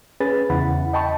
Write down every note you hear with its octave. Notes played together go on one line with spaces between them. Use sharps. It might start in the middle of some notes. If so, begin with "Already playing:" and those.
C#4 G#4 B4 A6
E2 C#3 E4 F#5 B5
D#5 G5 A5 B5 C#6